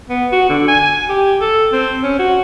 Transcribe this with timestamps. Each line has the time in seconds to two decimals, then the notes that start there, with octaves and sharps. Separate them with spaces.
0.09 B3
0.32 F#4
0.49 D3
0.68 G#5
1.09 G4
1.41 A4
1.73 C4
2.03 C#4
2.19 F#4